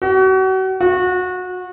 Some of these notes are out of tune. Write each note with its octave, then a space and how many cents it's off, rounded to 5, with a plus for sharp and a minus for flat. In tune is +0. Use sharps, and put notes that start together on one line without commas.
F#4 +35
F#4 -25